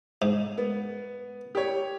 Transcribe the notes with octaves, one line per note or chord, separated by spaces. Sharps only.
G#2
B3
G4 C#5